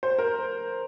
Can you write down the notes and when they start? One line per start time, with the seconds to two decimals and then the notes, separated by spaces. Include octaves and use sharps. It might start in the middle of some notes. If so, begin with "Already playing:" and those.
0.03 C5
0.18 A#4